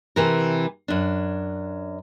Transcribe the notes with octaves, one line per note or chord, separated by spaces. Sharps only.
C3 E3 A#4
F#2 D4